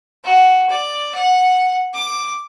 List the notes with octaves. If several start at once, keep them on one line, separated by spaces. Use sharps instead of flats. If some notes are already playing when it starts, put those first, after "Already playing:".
F#4
D5
F#5
D6